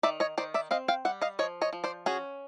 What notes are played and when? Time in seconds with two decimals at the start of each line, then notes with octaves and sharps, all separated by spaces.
0.03 D#3 D5 E5
0.20 C#5 D#5
0.38 D#3 C5 D5
0.54 D5 E5
0.71 C4 D#5 F5
0.88 F5 G5
1.05 G3 E5 F#5
1.21 D#5 F5
1.39 F3 C#5 D#5
1.61 C#5 D#5
1.73 F3
1.84 C5 D5
2.06 C#4 F#4 G#4